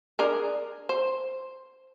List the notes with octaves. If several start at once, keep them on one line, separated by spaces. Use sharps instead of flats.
D4 G#4 A#4
C5